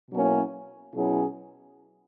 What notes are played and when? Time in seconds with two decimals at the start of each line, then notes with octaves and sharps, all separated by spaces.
0.11 B2 F#3 A#3 C#4 E4
0.94 B2 F#3 C#4 E4 G#4